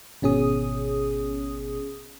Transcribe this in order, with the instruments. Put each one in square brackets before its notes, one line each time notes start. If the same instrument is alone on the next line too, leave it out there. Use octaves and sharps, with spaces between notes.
[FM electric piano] G#1 B2 C#4 G#4 D#6